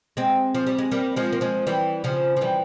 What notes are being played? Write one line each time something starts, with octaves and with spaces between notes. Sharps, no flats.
G#3 C4
F3
G3
G#3
G3 A#3
F3 G#3
A#3
F3 G#3
E3 G3
C#3 F3
F3
E3 G3